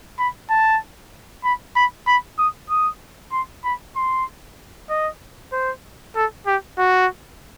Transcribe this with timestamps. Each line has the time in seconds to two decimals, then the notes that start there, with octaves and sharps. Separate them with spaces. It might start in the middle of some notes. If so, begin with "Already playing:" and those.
0.18 B5
0.50 A5
1.44 B5
1.76 B5
2.07 B5
2.38 D#6
2.70 D#6
3.32 C6
3.64 B5
3.96 C6
4.90 D#5
5.52 C5
6.16 A4
6.47 G4
6.78 F#4